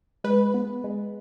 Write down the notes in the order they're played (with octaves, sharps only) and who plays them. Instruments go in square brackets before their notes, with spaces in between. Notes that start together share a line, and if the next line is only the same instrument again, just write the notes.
[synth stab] G#3 B4
B3
G#3